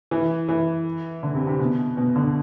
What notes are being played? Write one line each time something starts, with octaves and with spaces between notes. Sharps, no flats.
E3
E3
D3
C3
C3
B2
B2
D3